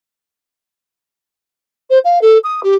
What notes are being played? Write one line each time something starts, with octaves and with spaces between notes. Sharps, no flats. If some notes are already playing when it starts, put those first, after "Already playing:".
C5
F5
A4
D#6
G4